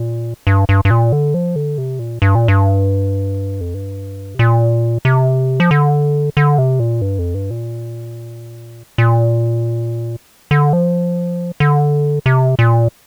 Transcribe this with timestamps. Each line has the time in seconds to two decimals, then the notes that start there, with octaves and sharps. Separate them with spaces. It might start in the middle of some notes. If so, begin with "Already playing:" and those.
Already playing: A#2
0.47 G2
0.69 G2
0.85 G2
0.91 A#2
1.12 D3
1.34 F3
1.56 D3
1.78 C3
1.99 A#2
2.22 G2
2.35 A#2
2.48 G2
3.61 F2
3.74 G2
4.35 C3
4.39 A#2
5.05 C3
5.60 F3
5.71 D3
6.37 D3
6.58 C3
6.80 A#2
7.02 G2
7.19 F2
7.34 G2
7.50 A#2
8.98 A#2
10.51 D3
10.73 F3
11.60 D3
12.26 C3
12.59 A#2